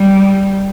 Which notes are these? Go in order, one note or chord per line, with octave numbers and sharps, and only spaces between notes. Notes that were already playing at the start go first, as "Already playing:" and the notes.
Already playing: G3